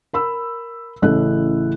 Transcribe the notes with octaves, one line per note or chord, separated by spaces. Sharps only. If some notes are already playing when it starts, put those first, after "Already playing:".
A#4 B5 E6
A1 C#3 E4 A4 F#6